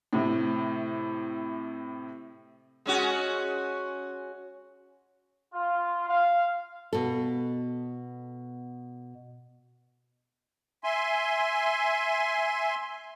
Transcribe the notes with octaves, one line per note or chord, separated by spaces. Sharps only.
A2 C3
G#3 C#4 F#4
F4
F5
B2 A4
E5 G#5 C6